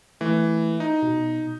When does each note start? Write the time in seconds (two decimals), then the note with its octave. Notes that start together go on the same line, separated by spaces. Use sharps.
0.21 E3 A3
0.80 D#4
1.02 B2